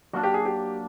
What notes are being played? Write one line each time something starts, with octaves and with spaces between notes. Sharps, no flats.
F#3 A#3 D4 F#4
G4
G#4
G4